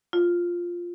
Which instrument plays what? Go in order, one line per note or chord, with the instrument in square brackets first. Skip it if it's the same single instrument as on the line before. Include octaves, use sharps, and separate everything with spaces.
[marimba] F4